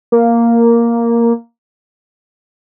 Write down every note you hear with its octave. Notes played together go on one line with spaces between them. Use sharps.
A#3